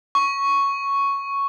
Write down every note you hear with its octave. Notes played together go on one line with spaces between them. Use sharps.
C#6